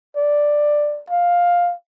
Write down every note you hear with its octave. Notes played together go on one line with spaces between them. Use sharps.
D5
F5